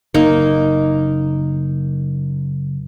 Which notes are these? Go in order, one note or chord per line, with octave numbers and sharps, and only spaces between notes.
F#1 A#3 D#4